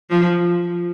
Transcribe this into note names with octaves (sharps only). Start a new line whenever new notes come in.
F3